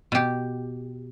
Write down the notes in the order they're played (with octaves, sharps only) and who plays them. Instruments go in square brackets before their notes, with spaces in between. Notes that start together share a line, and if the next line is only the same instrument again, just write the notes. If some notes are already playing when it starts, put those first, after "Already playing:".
[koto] B2 G4